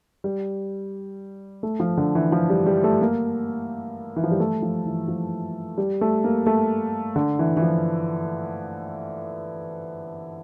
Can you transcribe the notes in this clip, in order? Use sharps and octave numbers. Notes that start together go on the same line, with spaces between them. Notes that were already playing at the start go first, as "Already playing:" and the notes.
G3
A3
F3
D3
E3
F3
G3
G3
A3
A#3
E3
F3
G3
A3
F3
E3
F3
G3
A3
A#3
A3
D3
E3
E3
F3